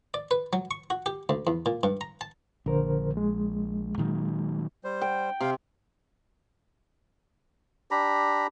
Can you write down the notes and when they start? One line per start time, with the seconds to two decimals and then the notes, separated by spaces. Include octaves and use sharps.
0.14 D5
0.31 B4
0.53 F#3
0.71 C#6
0.90 F#4
1.06 G4
1.29 D2
1.47 E2
1.66 A#2
1.83 G2
2.01 A#5
2.21 A5
2.66 A#1 D3 A#4 C5
3.17 G#3
3.98 A#2 D#3 F#3
4.84 G3 C5
5.02 G5
5.40 C3 F5 G5
7.91 D4 G4 A#5 B5